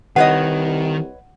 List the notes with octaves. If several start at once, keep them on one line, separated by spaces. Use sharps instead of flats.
C2 D#3 B4 C#5 D#5 F#5